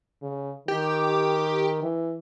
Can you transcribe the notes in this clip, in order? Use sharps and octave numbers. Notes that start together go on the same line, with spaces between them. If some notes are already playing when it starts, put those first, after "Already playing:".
C#3
D#3 G4
E3